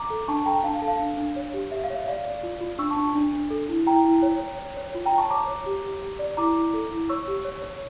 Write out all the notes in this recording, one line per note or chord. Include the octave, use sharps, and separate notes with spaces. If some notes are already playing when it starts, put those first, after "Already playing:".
Already playing: A#5 D6
A4
D4 A5 C#6
A4 G5 A#5
D4 F5 A5
F5 A5
A4
F5
D4
D4
C#5
G4
G4 E5
F5
C#5
E5
D5 F5
D5
F4
F4
D4 C#6 E6
A5 C#6
D4
D4
D4
A4
E4
E4 G5 A#5
E4
C#5
C#5
C#5
C#5
F4
G5 A#5
F4
A5 C#6
C#5 A#5 D6
C#5
G4
G4
G4
D5
E4 A#5 D6
E4
A4
E4
C#5 C#6 E6
G4
C#5
C#5